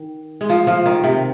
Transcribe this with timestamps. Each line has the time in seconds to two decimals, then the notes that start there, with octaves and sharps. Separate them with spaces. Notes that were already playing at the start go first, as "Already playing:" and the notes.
Already playing: D#3
0.41 G#3
0.49 F3
0.67 F3
0.86 D#3
1.04 C3